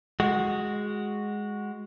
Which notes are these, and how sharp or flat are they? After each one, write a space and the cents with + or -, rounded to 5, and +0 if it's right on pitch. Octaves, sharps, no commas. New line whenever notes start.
G#3 +0 F#4 +0